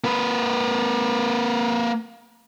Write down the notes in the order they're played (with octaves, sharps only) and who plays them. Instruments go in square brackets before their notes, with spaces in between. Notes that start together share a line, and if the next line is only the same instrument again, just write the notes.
[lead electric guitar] A#3 B4